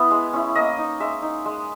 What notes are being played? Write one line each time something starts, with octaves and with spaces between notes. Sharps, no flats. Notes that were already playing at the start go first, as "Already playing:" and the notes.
Already playing: B3 E4
G#3
C#4 E4
A#3 D#5
D#4
G#3 E5
D#4
G#3